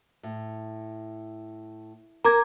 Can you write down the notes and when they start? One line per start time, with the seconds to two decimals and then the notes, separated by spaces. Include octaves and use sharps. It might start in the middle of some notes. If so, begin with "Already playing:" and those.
0.23 A2
2.25 A#4 A#5 D6 G#6